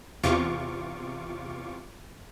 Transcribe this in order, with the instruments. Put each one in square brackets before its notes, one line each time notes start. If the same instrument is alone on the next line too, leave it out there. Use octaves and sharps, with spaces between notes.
[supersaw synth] E2 C3 F4 C#6 D6